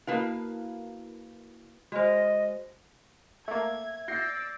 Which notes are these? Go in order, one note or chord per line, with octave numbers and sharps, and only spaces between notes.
A#3 E4 F#4 A#4 B4 F5
G#3 F#4 C5 D#5
A3 A#3 E5 G#6
D5 E6 G6 A#6 C7